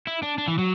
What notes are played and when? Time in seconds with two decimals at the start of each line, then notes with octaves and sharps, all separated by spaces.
0.07 E4
0.23 D4
0.38 D4
0.48 E3
0.58 F#3